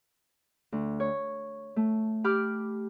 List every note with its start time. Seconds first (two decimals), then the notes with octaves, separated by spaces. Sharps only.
0.72 D2
1.00 C#5
1.76 A3
2.24 G4 B5 D6 F6